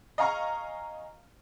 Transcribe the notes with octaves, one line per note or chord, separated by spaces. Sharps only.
D#5 F5 G#5 A#5 C#6 F6